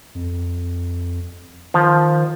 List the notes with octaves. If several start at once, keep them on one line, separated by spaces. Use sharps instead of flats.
F2
D#3 F3